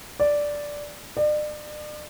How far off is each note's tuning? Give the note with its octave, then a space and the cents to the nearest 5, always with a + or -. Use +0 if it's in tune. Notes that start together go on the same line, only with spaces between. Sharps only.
D5 -5
D5 +40